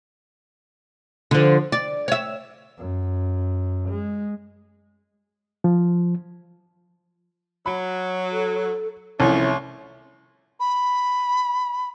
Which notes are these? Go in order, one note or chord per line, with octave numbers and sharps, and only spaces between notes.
D3 F3
D5
C#5 E5
F#2
G#3
F3
F#3 B5
A4
C2 E3 F3 A3 C#4 E4 C#5
B5